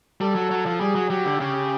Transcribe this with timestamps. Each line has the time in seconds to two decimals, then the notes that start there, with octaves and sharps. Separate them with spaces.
0.21 G3 A4
0.35 F#3
0.51 F#3
0.66 F3
0.80 G3 G#4
0.95 F#3
1.10 F#3 G4
1.25 D3
1.40 C#3 G4